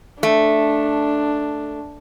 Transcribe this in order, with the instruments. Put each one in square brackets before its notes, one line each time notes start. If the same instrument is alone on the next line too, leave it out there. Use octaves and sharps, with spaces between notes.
[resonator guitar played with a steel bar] A3 [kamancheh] D4